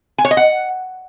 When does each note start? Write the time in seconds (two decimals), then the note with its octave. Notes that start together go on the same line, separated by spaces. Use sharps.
0.18 G#5
0.25 C#5
0.31 D#5
0.37 F#5